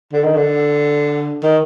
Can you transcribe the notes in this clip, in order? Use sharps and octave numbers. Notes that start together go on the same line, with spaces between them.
D3
D#3
D3
D#3